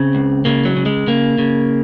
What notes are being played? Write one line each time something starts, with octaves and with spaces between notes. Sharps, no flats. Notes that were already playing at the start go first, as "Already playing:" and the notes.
Already playing: C#3 C4
C#2
C#3 A#3
F#3
C#3
G#3
C#3 A#3
C#3